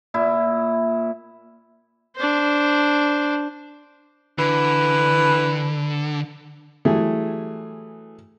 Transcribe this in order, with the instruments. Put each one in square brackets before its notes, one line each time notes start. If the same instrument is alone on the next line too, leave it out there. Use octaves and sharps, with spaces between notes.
[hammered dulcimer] A#2 E4
[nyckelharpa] D4 C5
[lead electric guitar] D3 [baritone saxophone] E3
[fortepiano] E3 F#3 G3 A3 G#4